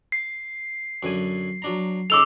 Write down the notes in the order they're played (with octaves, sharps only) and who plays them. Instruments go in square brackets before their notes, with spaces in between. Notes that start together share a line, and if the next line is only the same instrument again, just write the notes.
[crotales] C7
[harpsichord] F#2 D3 G#5
F#3 D4 A#5
[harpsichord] C#3 D#4 A4 [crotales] D6 E6 F7